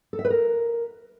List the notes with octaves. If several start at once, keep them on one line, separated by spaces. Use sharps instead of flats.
A4
E5
B4
A#4